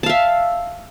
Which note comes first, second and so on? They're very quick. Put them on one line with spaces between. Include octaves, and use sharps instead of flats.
A5 F5 E5